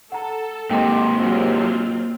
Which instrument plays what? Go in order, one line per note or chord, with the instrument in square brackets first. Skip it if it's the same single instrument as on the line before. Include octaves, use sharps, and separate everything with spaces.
[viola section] A4 [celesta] F#5 A#5
[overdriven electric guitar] G#2 C3 [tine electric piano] A#3 D#5 [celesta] G5 C6
[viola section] F#3 C4 F4